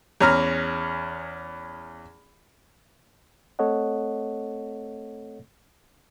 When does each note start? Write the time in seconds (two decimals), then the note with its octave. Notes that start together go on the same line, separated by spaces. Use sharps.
0.20 E2 C#4 A#5 F6
3.59 A3 C4 A4 C#5 D#5 F#5